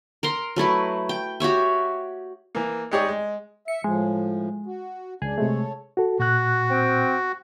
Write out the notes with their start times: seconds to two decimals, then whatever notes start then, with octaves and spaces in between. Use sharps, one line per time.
0.23 A#4 A#5 C6
0.56 F#3 A3 E4 B4
1.09 G5
1.40 F#4 G4 C#5 E5
2.55 E3 A#3
2.91 G#3 D#4 G4 G#4 C#5 D5
3.08 G#3
3.68 E5 C#7
3.84 A2 F3 G#3
4.66 F#4
5.22 C#2 D4 G#4
5.38 C3 G#3 A3 A4 C#5
5.97 F#4 A4
6.20 A#2 F#4 F#6
6.70 C4 G5